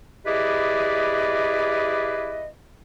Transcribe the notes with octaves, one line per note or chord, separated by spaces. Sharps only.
E4 G4 G#4 B4 D5 D#5